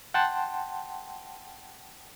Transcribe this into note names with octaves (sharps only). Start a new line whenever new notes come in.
F#5 G5 A5 C6